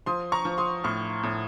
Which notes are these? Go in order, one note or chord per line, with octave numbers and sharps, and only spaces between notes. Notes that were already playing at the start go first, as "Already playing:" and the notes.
F3 C6 D#6
A#5 C#6
F3
C6 D#6
A2 C#6 F6
A2